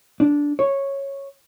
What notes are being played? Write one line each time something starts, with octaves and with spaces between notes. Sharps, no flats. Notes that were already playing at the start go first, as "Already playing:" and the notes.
D4
C#5